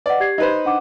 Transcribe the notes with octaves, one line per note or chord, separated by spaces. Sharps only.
B4 D5 D#5 F#5
G4 G#6 C7
D#4 B4 C5
D4 F#5 D6